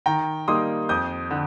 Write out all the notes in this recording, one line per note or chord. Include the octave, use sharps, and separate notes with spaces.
D#3 G5 A#5
G3 A#3 D#4 C6 D#6
F2 D#6 G6
D3